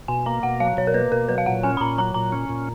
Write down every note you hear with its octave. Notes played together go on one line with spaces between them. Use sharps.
B2 G#5
A#3 A#5
B2 F#5
F#3 F5
B2 C#5
A#4
A#3 B4
B2 A#4
F#3 B4
F5
A#2 F#5
C#4 G#5
B5
A#2 A#5
F#3 A#5
A#2 A#5
C#4
A#2